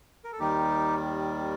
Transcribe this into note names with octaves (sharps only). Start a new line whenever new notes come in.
A#4
A4
D#2 D#3 G3 D#4 G4